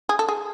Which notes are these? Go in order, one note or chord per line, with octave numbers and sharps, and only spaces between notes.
G#4
A4
G#4